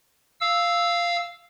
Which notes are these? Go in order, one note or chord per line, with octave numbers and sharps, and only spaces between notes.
F5 E6